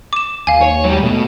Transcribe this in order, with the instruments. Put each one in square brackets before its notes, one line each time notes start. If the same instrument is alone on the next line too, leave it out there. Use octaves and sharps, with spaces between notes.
[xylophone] D6 E7
[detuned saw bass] D#2 [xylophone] F5 G#5
[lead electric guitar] C#5
F#3 G3
[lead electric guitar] B2 [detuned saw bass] A3